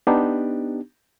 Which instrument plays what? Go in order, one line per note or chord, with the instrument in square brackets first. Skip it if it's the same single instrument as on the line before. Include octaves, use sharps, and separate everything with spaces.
[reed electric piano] B3 D4 D#4 G4